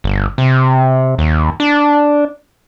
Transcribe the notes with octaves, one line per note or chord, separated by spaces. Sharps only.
G1
C3
D#2
D4